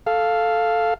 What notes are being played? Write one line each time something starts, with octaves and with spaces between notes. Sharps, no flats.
A4 F5